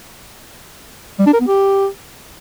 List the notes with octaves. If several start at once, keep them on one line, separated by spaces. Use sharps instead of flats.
G3
D4
A#4
B3
G4